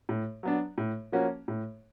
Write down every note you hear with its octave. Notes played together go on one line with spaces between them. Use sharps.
A2
F#3 B3 D4
A2
F3 A#3 C#4 F#4
A2